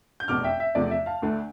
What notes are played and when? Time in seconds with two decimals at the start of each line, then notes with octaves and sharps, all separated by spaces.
0.20 G6
0.28 F1 E2 B2 D6 F6
0.44 E5 G5
0.60 E5
0.75 E2 C3 F3 A3 D5
0.91 E5
1.06 F5 A5
1.22 D2 D3 A3